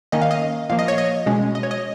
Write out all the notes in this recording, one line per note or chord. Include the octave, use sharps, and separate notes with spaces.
D#3 A#3 C#4 D#5
F5
D#5
A#2 F3 A#3 F5
D#5
C#5
D#5
B2 G#3 C#4
D#5
C#5
D#5